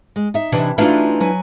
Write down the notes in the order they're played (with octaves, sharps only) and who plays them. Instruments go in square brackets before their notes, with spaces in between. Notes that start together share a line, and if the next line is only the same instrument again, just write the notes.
[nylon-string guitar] G#3
D#4 E5
[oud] C3 E3 D4
[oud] E3 D4 F4 [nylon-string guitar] A3 D#4 F#4
[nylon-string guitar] F#3 B4 G#5